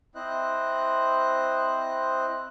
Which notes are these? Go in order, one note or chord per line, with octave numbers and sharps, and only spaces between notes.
C4 E4 C5 D#5 F#6